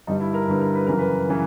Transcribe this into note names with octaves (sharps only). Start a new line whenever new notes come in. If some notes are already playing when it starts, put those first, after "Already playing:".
G2 D3 G3 D#4
E4
A#4
G2 D3 G3 B4
A#4
B4
F#2 C#3 E3 A#4
B4
C#3 E3